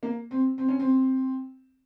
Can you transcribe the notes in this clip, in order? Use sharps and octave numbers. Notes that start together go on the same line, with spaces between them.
A#3
C4
C4
C#4
C4